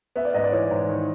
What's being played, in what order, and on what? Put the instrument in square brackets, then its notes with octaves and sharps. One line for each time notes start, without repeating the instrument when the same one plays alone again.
[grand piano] B3 [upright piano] E5
[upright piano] D5
[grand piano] G#2 [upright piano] D#5
[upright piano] D5
[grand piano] E3 [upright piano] C#5
[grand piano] G#2
D#3